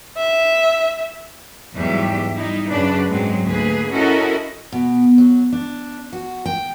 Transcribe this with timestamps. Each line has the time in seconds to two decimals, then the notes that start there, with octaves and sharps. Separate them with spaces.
0.18 E5
1.75 E2 G#2 F#3 G3 G4 E5
2.35 G3 D#4 E4
2.71 F#2 C#3 F#3 D4 B4 D5
3.10 G#2 F#3 G#3 C4
3.47 D2 A#3 G#4 B4
3.93 C#4 E4 F#4 A4 A#4 D#5
4.72 B2
5.18 F#3
5.52 D4
6.13 F#4
6.46 G5